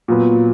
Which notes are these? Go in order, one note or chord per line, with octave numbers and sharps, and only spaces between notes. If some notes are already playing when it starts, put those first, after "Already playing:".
A#2 F#3 B3